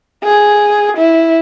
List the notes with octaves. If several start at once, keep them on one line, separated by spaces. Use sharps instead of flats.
G#4
E4